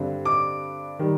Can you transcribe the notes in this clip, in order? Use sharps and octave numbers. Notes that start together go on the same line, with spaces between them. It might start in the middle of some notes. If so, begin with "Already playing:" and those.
Already playing: G2 D3 G3 C4
D6
D#3 G3